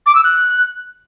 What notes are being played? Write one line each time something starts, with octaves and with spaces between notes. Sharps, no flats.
D6
E6
F#6